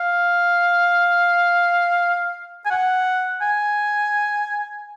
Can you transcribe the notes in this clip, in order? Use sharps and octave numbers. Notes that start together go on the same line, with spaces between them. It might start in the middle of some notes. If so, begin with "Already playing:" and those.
Already playing: F5
G#5
F#5
G#5